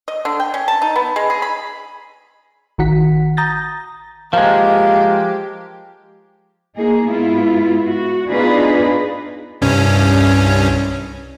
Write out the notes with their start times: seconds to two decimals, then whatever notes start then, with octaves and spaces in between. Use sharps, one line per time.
0.08 D#5
0.25 D3
0.40 G5
0.54 C#4
0.68 A5
0.82 D#4
0.96 B3
1.16 G#3
1.30 G#4
1.42 B5
2.78 A1 D#3 F#4 F#5 B6
3.37 A#5 D#6 G6 A6 A#6
4.33 F3 G#3 A#3 G4
6.75 A#3 D#4 G#4
7.06 G#2 B3 E4 F4
7.84 F#4
8.28 B3 D4 D#4 F4 G#4 B4
9.62 C2 G2 C#4